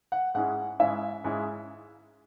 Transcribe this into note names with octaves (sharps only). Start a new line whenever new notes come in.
F#5
G#2 G#3 C#4 E4 F#5
G#2 G#3 C#4 E4 E5
G#2 G#3 C#4 E4